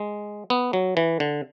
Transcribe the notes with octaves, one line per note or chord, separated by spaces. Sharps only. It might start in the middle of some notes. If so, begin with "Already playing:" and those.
Already playing: G#3
B3
F#3
E3
D3